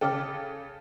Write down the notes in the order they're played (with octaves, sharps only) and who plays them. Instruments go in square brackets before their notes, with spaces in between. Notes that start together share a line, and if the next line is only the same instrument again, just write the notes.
[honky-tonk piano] C#3 A4 [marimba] G5 D6 F6